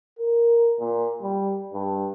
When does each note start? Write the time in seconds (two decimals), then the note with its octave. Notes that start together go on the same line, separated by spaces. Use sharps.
0.19 A#4
0.79 A#2
1.22 G3
1.73 G2